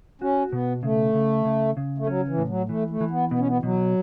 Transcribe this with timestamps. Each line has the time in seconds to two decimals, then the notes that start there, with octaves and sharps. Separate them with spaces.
0.22 C#4 F#4
0.51 B2 B3
0.83 C#3 A3
1.14 C#3
1.45 C#3
1.77 C#3
1.98 A3
2.07 F#3 C#4
2.28 E3
2.38 A2
2.48 F#3
2.69 E3 A3
2.90 A3
3.01 E3
3.11 B3
3.31 B2 B3
3.39 C#4
3.48 B3
3.63 B2 F#3